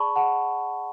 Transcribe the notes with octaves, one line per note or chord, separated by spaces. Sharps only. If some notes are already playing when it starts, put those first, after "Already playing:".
Already playing: G#4 D5 A5 B5 C#6
G#4 F#5 A5